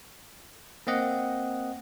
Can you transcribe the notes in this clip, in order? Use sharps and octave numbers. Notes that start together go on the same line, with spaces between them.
A#3 C4 D#5 F#5